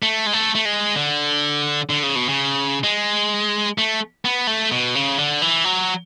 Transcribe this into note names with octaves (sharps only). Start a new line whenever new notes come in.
A3
G#3
A3
A3
G#3
D3
D3
C#3
B2
C#3
G#3
A3
B3
A3
B2
C#3
D3
E3
F#3